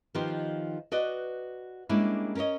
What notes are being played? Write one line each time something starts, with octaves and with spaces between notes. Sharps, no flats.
D#3 F3 B3 D#4 G4 C5
F#4 B4 D5 D#5
G3 G#3 A#3 C#4 D4 E4
C#4 A#4 C5 C#5 D#5